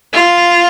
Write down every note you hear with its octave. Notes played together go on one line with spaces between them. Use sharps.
F4